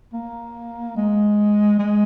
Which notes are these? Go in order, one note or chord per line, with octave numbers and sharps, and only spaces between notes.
A#3
G#3
G#3